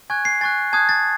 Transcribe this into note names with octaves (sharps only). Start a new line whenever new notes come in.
G#5 C#6 F#6 G#6
C7
G#5 C#6 F#6 A6
A5 D#6 F#6 G#6
A6